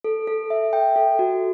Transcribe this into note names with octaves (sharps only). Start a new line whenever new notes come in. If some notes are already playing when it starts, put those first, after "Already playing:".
A4
A4
E5
G5
A4
F#4